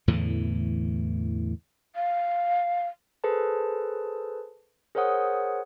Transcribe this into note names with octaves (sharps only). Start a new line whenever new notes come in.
E2 A2 D3 E3
F5
G#4 A4 B4 C5 A5
G#4 A#4 C5 C#5 F#5 D#6